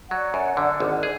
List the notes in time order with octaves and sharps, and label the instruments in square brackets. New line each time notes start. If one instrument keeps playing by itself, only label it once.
[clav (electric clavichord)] F#3 [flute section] D5 F#5
[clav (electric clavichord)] F#2
D3
G#1
G#4